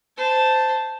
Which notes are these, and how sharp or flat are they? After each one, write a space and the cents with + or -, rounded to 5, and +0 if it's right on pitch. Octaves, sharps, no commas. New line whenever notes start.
C5 -15 A5 +0